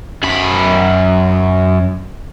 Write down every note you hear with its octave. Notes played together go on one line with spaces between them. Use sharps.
F#2 B5